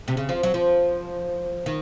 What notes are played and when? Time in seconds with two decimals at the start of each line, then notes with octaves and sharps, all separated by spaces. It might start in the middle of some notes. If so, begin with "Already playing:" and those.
0.08 C3
0.17 C#3
0.29 F3
0.43 F#3
0.54 F3
1.66 D#3